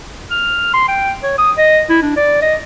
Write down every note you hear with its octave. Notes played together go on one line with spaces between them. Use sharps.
F6
C6
G5
C#5
D#6
D#5
E4
D4
D5
D#5